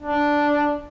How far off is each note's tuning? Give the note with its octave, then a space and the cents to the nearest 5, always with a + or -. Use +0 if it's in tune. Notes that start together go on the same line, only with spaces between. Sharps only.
D4 -5